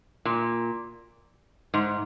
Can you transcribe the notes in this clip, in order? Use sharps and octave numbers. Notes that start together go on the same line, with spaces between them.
A#2
G#2